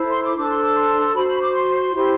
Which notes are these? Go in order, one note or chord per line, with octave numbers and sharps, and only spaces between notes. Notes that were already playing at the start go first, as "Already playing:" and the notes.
Already playing: E4 A4 C5
C6
D6
D4 A4 C5 D6
C6
D6
C6
F#4 C5 B5
B5
D6
C6
E4 G4 C5